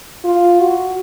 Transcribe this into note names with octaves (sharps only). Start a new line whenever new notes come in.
F4
F#4